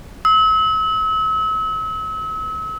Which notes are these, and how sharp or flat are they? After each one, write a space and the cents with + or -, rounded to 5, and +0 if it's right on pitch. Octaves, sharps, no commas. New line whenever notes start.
E6 -40